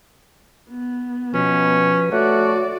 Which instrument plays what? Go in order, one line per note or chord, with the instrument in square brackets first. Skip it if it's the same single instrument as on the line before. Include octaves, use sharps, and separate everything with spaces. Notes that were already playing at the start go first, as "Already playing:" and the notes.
[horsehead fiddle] B3
[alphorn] B2 [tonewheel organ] F3 B4 [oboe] C#4
[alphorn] A3 [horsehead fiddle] F#4 D5 [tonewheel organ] C#5 [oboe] F#5